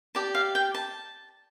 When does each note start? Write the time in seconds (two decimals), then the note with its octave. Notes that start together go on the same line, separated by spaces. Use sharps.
0.15 G4 D5 A5
0.35 F5
0.55 G5
0.74 A5